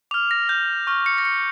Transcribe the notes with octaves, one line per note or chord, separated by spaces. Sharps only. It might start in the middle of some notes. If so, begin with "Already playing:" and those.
D6 F6 F7
A#6
G6
C#6 F6
C#7
A#6
C#7